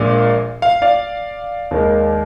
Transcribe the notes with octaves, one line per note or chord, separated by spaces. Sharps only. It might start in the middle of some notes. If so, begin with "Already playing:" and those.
Already playing: A#1 A#2 G#3 D5 F5
F5
D5 F5
D#2 D#3 G#3